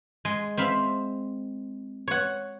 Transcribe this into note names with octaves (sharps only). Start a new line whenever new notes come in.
G#3
C4 E5 F5 B5
C#5 F#5